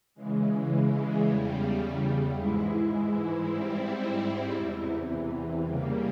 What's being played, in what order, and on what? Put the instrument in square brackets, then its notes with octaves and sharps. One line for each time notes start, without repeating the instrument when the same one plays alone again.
[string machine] C#3 E3 G#3
E2 C#3 G3
G#2 E3 G#3 E4
G#2 G3 C4 E4
E2 C3 E3
C#3 G3 A#3